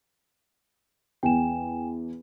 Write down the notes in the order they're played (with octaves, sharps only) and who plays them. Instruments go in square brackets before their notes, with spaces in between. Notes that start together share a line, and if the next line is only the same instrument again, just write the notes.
[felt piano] E2 [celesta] G5 G#5 E7